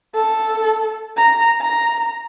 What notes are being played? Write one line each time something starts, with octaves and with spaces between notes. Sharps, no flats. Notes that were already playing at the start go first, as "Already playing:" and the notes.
A4
A#5
A#5